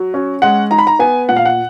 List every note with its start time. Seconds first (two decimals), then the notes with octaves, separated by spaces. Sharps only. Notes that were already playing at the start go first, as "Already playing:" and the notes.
Already playing: F#3
0.14 C#4
0.42 G#3 F#5
0.71 D#4 A#5
0.78 B5
0.87 A#5
0.99 B3 G#5
1.29 A#2 F#5
1.36 F5
1.45 F#5